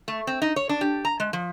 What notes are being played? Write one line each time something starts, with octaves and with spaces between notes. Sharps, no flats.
A3
C4
D#4
C#5
D4
G4
A#5
G#3
F3